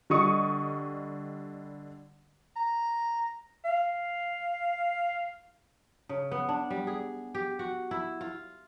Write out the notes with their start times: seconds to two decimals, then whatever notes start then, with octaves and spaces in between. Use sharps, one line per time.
0.10 D3 G3 D#5 C#6 D#6 C#7
2.56 A#5
3.65 F5
6.09 C#3
6.31 B3
6.49 D4
6.70 G3
6.87 G#4
7.35 G4
7.59 F#4
7.91 E4
8.21 F4